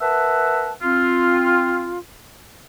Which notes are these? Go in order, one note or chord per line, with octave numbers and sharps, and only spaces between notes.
A#4 B4 E5 F#5 A5
C4 F4